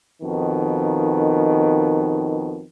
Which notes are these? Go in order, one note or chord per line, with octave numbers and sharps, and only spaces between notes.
F2 B2 D#3